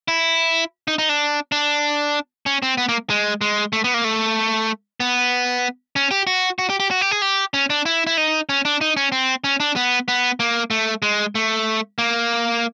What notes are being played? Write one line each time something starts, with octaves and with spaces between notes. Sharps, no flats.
E4
D#4
D#4
D4
D4
C#4
C4
B3
A#3
G#3
G#3
A3
B3
A#3
A3
B3
C#4
G4
F#4
F#4
G4
G4
F#4
G4
G#4
G4
C#4
D4
E4
E4
D#4
C#4
D4
D#4
C#4
C4
C#4
D4
B3
B3
A#3
A3
G#3
A3
A#3